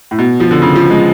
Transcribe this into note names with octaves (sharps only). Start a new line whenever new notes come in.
A2
B2
F3
D3
C#3
F3
G#3